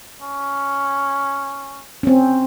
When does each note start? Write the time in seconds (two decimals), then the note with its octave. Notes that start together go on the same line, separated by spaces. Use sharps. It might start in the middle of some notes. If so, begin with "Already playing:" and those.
0.22 C#4
2.03 C4 C#4